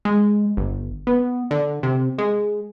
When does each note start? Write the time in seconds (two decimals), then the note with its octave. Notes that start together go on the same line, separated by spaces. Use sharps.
0.05 G#3
0.57 G1
1.07 B3
1.51 D3
1.83 C3
2.18 G#3